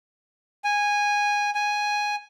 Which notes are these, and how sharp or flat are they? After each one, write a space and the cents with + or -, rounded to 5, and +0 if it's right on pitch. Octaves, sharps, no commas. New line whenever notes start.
G#5 -10
G#5 +0